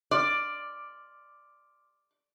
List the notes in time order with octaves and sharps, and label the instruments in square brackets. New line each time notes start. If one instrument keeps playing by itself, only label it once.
[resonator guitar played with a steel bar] D5 [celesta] C6 D6 F6